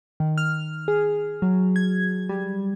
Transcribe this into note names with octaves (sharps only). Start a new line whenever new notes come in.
D#3
F6
G#4
F#3
G#6
G3